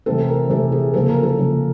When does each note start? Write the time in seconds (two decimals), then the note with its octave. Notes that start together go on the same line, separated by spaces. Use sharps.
0.06 C3 E3 A3 C4 A4
0.28 A#4
0.50 C3 E3 A3 C4 A4
0.72 G#4
0.94 C#3 F3 A#3 A4
1.09 A#4
1.23 A4
1.38 C#3 F3 A#3